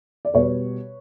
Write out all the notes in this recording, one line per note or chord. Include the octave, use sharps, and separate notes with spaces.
D5
B2 G3 B4 C#5